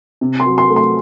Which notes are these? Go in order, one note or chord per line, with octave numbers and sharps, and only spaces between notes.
C3
C6
F#3
C6
A3
C6